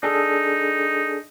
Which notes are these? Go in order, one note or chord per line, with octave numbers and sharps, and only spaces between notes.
D4 D#4 G#4 A4